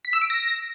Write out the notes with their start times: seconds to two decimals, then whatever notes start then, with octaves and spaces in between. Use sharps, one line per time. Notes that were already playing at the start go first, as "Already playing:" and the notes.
0.05 B6
0.13 E6
0.22 D7
0.30 A#6